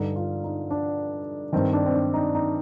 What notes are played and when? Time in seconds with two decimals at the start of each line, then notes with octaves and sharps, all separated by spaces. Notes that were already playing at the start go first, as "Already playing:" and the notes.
Already playing: G2 D3 D#4
0.16 F4
0.44 D#4
0.70 D4
1.53 G2 D#3 C4
1.73 D4
1.86 C4
1.94 D4
2.14 D#4
2.35 D#4